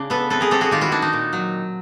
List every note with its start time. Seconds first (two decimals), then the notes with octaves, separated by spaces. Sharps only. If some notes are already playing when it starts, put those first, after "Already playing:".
Already playing: C#3 D4
0.10 B3 A4 B4
0.30 C4 A4 B4
0.41 G#4 A#4
0.51 C4 G4 A4
0.61 F#4 G#4
0.71 D#3 F4 G4
0.81 E4 F#4
0.92 D#3 D4
1.02 D#4
1.13 A#2
1.33 F#3